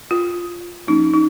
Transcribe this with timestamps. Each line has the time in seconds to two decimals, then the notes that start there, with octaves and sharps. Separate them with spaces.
0.11 F4
0.87 F3 A#3 C#4 D#4
1.14 D#4